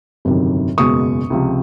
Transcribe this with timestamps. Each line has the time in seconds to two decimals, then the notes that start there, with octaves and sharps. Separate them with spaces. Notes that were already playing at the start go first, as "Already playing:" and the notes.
0.25 G1 F2 C3 D#3 F#3
0.78 F#1 E2 B2 G#3 C#6 D#6
1.30 C#2 C3 F3